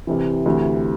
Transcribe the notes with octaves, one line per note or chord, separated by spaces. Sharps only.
C2 C3 E3
D2 C3 E3